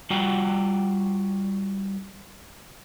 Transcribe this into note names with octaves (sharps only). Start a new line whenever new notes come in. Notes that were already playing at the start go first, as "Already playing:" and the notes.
G3 F4 F#4 F#5 G5